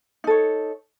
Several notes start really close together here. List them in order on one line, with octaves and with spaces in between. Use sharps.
D#4 A4 C#5